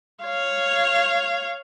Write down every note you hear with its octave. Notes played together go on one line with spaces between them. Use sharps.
C#5 F5